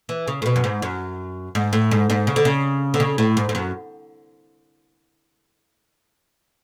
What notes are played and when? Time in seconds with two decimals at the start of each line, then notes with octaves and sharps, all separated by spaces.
0.09 E3
0.27 C#3
0.42 A2
0.46 B2
0.56 F#2
0.64 G#2
0.82 F#2
1.55 G#2
1.73 A2
1.91 G#2
2.10 G#2
2.27 C#3
2.36 D3
2.45 C#3
2.94 D3
3.00 C#3
3.18 A2
3.37 G#2
3.49 G#2
3.55 F#2